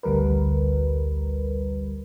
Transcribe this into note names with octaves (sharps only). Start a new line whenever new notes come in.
A1 D2 G3 A#4 B4